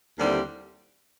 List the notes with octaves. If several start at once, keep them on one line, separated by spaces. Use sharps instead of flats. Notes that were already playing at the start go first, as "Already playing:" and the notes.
D#2 D3 G3 C4 E4